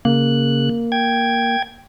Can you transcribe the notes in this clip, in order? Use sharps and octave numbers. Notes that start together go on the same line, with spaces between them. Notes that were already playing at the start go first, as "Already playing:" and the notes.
C#3 A#3 F#6
G5 G#6